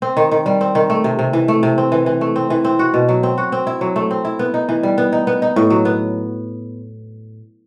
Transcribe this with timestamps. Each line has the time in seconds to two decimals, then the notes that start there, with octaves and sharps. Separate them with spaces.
0.02 C4
0.17 D#3
0.31 D#3
0.46 G3
0.61 C4
0.75 D#3
0.90 A3
1.04 C3
1.19 C3
1.33 E3
1.48 A3
1.63 C3
1.78 C4
1.92 E3
2.06 E3
2.21 A3
2.36 C4
2.50 E3
2.65 C4
2.79 F#4
2.94 B2
3.08 F#3
3.23 C4
3.38 F#4
3.52 C4
3.67 E4
3.81 F#3
3.96 A3
4.11 C4
4.25 E4
4.39 B3
4.54 D#4
4.69 E3
4.83 G3
4.98 B3
5.12 D#4
5.27 B3
5.42 D#4
5.56 A2
5.70 F#3
5.85 B3